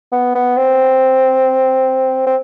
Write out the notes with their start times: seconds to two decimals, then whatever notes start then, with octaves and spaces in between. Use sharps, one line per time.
0.12 B3
0.35 B3
0.57 C4
2.26 C4